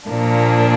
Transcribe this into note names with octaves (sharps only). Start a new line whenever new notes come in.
A#2 F3 A#3 D4